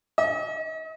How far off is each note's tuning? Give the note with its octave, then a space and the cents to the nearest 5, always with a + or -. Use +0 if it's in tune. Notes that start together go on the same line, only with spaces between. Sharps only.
D#5 +40